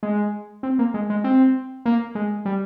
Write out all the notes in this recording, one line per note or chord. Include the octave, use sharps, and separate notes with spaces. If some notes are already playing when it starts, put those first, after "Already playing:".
G#3
C4
A#3
G#3
G#3
C4
A#3
G#3
G3